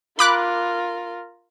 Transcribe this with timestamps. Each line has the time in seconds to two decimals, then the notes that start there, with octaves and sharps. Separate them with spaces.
0.19 F4 A#4 B5 D6 F#6